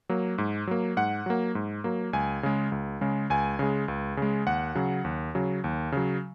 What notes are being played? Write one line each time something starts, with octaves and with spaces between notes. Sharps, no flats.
F#3 A#3
G#2
F#3 A#3
G#2 F#5
F#3 A#3
G#2
F#3 A#3
C#2 G#5
C#3 G#3
C#2
C#3 G#3
C#2 G#5
C#3 G#3
C#2
C#3 G#3
D#2 F#5
C#3 F#3
D#2
C#3 F#3
D#2
C#3 F#3